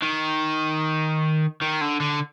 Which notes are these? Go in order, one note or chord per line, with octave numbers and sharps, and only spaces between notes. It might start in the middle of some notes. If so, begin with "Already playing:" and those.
D#3
D#3
D3
D3